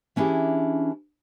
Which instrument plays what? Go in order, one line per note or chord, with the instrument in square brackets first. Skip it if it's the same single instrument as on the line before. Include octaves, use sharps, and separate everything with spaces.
[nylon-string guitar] E3 C#4 D4 E4 G4 G#4